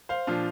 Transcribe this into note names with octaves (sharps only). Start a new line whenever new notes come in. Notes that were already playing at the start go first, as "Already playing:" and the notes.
C5 F5
A#2 F3 D4 F4